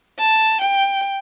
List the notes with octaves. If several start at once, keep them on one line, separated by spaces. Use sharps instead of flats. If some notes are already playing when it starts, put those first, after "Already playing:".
A5
G5